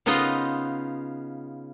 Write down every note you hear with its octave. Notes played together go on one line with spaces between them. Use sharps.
C#3 B3 D#4 F4 D#5 C6